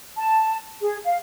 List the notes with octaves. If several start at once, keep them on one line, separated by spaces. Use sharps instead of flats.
A5
G#4
F5